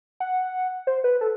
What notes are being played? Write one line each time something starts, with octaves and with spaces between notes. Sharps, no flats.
F#5
C5
B4
A4